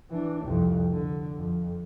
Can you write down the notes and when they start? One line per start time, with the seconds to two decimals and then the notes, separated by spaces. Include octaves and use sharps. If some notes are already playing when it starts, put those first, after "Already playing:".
0.10 E3 D4
0.43 C2 F2
0.92 D3
1.36 F2